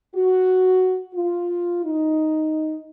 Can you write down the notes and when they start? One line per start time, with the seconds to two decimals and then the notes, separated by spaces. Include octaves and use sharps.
0.15 F#4
1.14 F4
1.85 D#4